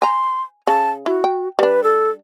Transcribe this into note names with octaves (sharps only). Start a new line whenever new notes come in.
G#5 A#5 C6
C#3 A5
E4 F#4
G5
G3 D4 B4
A4